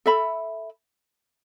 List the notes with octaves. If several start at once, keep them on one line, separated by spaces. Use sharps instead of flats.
A4 E5 B5